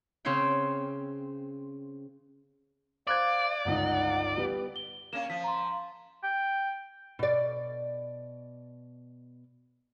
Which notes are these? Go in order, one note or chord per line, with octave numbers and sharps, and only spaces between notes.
C#3 C4 C5 C#5 F5 G5
C5 D5 F5 F#6 G#6
G1 C#2 D#4 F#5
G3 B3 B4
G7
A#3 C#4 E7
F3 B6
A#5 C6
G5
B2 D5